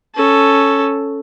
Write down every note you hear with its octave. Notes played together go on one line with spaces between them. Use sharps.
C#4 A4